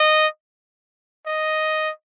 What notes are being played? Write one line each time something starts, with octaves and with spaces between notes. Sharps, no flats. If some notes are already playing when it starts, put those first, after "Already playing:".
Already playing: D#5
D#5